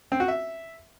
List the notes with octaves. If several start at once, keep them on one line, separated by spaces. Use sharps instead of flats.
C4
F#4
E5